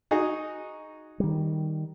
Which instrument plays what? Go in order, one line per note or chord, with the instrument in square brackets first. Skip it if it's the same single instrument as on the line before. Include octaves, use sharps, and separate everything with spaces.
[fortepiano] D#4 F#4 G#4
[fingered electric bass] D#3 G3